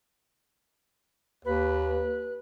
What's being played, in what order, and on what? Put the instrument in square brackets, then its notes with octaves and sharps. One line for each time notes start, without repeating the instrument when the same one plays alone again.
[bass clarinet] D#2 [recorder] B4